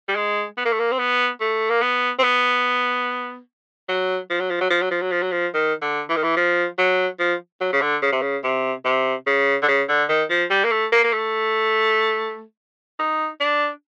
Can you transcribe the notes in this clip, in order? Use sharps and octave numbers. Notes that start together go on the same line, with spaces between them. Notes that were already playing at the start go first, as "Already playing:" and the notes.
G3
G#3
B3
A#3
A3
A#3
C4
B3
A3
A#3
B3
C4
B3
F#3
F3
F#3
F3
F#3
F3
F#3
F3
F#3
F3
F#3
F3
D#3
D3
E3
D#3
E3
F3
F#3
F3
F#3
C#3
D3
C#3
C3
C#3
C3
C3
C#3
D3
C#3
D3
D#3
F3
G3
A#3
A3
A#3
A#3
A3
D#4
D4